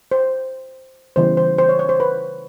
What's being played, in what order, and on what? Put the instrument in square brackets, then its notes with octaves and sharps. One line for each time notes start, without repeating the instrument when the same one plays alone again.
[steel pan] C5
C#3 E3 G3 B3 C5
C5
C5
C#5
C#5
C5
B4